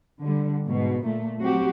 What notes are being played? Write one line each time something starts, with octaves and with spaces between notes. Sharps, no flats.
D3 G3
G#2 B2
A#2 A3
F#3 C4 F#4 G4